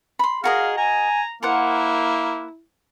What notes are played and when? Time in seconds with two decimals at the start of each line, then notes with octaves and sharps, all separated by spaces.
0.19 B5 C6
0.44 F#4 G#4 A#4 D#5 F5
0.77 G#5 A#5
1.43 A#3 E4 A#4 C5 F#5